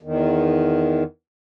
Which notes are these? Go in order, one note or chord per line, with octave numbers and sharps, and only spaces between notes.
E2 D#3